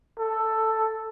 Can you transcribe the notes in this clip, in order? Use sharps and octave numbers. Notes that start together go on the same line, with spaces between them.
A4